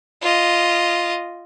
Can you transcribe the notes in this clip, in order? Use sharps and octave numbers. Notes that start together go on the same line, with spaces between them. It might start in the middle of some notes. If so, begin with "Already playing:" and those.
F4 D#5